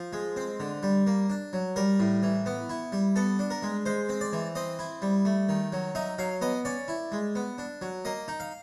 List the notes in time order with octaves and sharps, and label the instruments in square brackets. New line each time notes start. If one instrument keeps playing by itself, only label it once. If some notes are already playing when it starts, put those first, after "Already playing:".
Already playing: [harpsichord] F3
G#3
C4
D3
G3
A#3
D4
F#3
G3 A#4
A2
E3
B3
E4
G3
B3 A4
D4
A#4
G#3
G#3 C5
C4
D5
E3
C4 D#5
E4
G3
A3
D#3
F#3
D#4 E5
F#3 F5
B3 D#5
C#4 D5
E4
G#3
B3
D4
F#3
A#3 D#5
D#4
F5